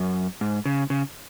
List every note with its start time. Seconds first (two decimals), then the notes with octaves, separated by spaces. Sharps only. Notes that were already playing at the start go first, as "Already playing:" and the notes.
Already playing: F#2
0.41 G#2
0.66 C#3
0.90 C#3